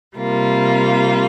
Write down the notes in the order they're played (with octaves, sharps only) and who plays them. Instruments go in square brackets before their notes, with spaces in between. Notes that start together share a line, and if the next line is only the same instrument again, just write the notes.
[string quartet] C3 G3 A#3 F4